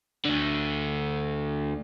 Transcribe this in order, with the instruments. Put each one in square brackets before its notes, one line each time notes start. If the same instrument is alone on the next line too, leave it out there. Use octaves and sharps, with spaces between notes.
[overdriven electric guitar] D2 D3